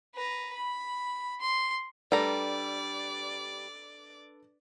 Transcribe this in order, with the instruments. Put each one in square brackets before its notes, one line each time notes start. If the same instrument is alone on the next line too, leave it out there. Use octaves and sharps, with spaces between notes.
[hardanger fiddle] B4 A#5
B5
C6
[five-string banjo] G3 A#5 [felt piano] D4 A4 B4 [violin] D5